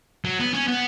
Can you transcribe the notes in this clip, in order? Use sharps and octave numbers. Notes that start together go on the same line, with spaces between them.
F#3
B3
C#4
B3